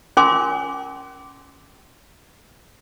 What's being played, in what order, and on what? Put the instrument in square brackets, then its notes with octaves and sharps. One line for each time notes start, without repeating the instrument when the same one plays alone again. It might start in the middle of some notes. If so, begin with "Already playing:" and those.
[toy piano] C#4 F4 A#4 G#5 C6 D6